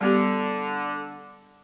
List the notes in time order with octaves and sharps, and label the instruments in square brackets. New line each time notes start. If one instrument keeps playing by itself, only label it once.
[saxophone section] D3 [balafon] G3 B3 G4